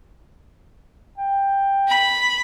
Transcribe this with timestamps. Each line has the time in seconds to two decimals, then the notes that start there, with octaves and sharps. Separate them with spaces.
1.18 G5
1.88 B5